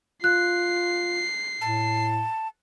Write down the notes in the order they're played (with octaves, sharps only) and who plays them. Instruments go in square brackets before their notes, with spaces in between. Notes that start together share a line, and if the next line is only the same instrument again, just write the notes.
[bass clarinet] F4 [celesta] F#6 [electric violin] C7
[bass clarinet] A2 [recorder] A5